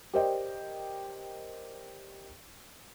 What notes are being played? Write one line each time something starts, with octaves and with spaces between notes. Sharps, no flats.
G4 A#4 C5 D5 D#5 G5